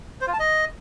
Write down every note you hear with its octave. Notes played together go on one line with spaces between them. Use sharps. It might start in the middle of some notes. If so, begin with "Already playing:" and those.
C5
F4
A5
D#5